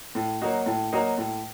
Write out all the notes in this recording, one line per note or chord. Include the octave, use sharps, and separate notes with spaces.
A2
F#3 A#3 D#4 F#4
A2
F#3 A#3 D#4 F#4
A2